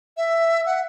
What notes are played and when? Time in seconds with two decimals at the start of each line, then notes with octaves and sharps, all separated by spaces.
0.17 E5
0.66 F#5